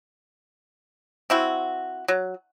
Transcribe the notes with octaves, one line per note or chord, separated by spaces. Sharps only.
C4 E4 F#4
F#3